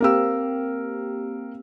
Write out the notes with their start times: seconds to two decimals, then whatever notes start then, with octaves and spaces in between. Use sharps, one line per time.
0.01 A#3 C4 G4 A#4 F5 E6